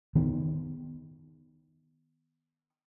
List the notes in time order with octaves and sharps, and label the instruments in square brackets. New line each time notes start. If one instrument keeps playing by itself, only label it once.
[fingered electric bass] D#3 B3